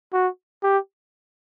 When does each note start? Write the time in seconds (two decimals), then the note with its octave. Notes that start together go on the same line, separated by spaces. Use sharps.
0.13 F#4
0.63 G4